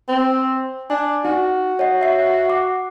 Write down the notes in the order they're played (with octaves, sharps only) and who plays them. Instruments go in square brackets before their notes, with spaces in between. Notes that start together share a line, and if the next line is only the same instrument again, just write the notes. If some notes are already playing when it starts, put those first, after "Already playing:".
[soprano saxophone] C4
[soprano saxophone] D4 [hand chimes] G#5
[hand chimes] D#4 [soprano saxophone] F#4
[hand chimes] C#5 D#5 F#5
E5 C7
F#5 D6